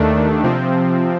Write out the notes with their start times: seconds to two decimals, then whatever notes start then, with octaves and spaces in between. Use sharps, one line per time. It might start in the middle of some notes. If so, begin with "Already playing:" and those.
Already playing: D#2 D#3 A3 D4
0.43 C3 F3 C4